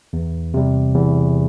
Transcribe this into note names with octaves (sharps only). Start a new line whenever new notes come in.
E2
C3 G3
E2